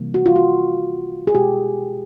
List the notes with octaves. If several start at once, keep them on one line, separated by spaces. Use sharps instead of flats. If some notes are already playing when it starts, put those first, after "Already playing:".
Already playing: C3 E3 G3 A#3
F#4
F4
F#4
G#4
B2 G#3 G4